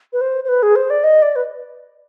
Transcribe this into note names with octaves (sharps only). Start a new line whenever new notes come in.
B4
C5
C5
B4
G#4
C5
D5
D#5
D5
B4